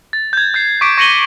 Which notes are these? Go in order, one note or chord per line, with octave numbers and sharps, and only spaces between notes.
A6
G6 G#6
G6 A6 C7
C#6 D6 B6 D7
C#6 A#6 C#7 D#7 F#7 G7